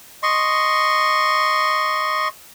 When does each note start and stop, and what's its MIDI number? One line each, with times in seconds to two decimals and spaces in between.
0.23 2.28 75
0.23 2.28 84
0.23 2.28 85